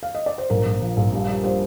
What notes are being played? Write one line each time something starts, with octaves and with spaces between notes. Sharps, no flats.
F5
D#5
D5
C5
A#1 A#4
A#1
F3
A#1
G2
G3
G3 C5